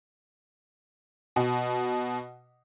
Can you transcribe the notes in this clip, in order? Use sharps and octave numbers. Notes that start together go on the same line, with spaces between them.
B2